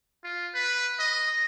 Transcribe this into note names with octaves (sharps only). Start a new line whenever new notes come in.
F4
B4
D#5